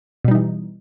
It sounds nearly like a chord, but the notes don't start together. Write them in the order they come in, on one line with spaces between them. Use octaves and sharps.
B2 G3 D#4 E3